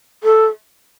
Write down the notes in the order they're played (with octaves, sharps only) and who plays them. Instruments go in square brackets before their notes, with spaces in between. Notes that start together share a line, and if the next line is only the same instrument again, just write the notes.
[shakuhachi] A4